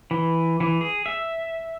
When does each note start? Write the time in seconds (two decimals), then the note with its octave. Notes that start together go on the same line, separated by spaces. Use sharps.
0.11 E3
0.60 E3
0.81 G#4
1.06 E5